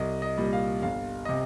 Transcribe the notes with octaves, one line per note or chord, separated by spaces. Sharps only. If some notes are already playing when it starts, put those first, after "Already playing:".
Already playing: C2 D#5
D#5
A#2 G3
F5
G1 F5
C3 D#5